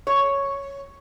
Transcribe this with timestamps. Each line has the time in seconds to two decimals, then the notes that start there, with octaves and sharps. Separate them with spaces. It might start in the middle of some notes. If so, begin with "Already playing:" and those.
0.07 C#5